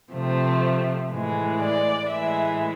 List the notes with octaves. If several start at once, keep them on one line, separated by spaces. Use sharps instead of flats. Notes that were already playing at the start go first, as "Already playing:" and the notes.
C3 F3 A3 C4
A2 E3 G#3
D5
A2 E3 G#3 E5